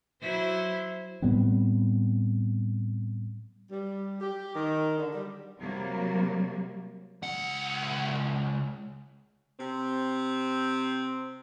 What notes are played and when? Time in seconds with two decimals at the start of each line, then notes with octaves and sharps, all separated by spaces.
0.22 F#3 E4 C5
1.22 A2 G3 B3 C4
3.70 G3
4.20 G4
4.54 D#3
4.98 D3
5.13 G3
5.59 C3 F#3 G3 A#3
7.22 C#2 F#5
9.58 C3 C4